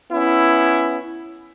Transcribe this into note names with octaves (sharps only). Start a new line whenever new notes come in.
B3 C#4 E4